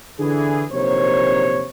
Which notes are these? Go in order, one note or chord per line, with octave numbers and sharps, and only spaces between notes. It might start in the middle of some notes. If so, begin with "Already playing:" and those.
D3 E3 G#4
A#1 C3 D#3 F#3 C5 C#5